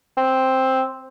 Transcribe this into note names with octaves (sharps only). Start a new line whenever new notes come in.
C4